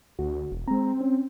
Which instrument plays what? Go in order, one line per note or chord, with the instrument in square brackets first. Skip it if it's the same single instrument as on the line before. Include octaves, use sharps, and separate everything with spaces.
[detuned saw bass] D2 [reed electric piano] F#4
[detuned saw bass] E1
[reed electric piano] G#3 A#5 [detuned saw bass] C4
[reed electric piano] C#4